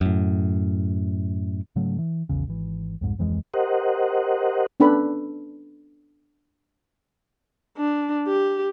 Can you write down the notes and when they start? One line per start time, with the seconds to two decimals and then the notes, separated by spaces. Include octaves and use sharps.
0.01 F#2 A2
1.76 G#2 C#3 F#3 A3
1.99 E3
2.29 A#1 E2 C#3
2.47 G#1 E3
3.01 C2 F2 G#2
3.18 D1 F2 E3 G#3
3.54 G4 A#4 C5 D#5 F#5
4.80 B3 C#4 D4 A4 B4 B5
7.77 D4
8.27 G4